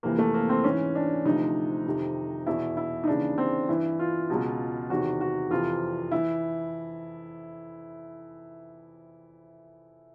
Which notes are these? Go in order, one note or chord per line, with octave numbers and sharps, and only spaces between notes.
F2 C3 E3 A#3
A3
A#3
C4
G#2 E3 C#4
D4
D2 C3 F3 D#4
F2 C3 D#3
E2 B2 E4
E4
D#4
D#2 C#3 E3 D4
C4
G2 E3 E4
F4
C#2 B2
E2 C3 D#3 F#4
F#4
F2 C3 E3 F4
E3 E4